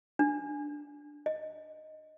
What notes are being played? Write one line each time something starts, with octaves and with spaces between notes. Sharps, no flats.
D4
D#5